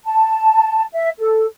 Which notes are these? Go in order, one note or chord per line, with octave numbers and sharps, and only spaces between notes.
A5
E5
A4